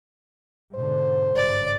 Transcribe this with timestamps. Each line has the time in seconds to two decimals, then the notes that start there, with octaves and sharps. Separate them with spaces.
0.75 G#2 B2 D3 C5
1.36 G#1 G2 C#3 D5